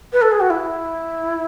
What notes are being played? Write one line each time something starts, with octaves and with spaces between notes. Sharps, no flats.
B4
A4
G#4
F#4
E4